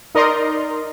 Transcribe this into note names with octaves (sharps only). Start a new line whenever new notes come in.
D#4 A#4 D5 D#5 A#5 C6